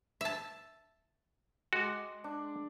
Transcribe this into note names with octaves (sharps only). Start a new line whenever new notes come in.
E5 A5
G#3 F#4 D6
D4